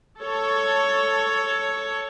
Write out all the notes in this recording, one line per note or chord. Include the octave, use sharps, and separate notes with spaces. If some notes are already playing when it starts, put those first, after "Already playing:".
A4 C#5